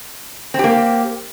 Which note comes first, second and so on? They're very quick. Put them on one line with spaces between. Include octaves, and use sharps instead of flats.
C4 G4 A#3